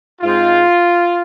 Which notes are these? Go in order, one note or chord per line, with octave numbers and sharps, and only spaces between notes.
G#2 G#3 C4 F4